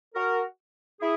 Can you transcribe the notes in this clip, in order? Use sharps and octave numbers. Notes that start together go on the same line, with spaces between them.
F#4 A#4
E4 G#4